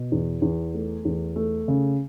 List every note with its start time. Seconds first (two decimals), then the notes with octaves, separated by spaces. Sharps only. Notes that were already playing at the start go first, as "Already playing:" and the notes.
Already playing: B2
0.12 E2
0.42 E2
0.74 A3
1.05 E2
1.36 A3
1.68 C#3